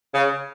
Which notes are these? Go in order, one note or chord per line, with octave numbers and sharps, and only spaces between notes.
C#3